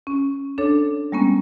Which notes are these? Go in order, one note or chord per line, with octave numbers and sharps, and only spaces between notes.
C#4
D4 A4 C#5
G3 G#3 A#3 B3 C#4